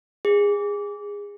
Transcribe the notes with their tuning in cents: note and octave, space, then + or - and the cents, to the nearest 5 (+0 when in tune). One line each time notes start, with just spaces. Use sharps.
G#4 -25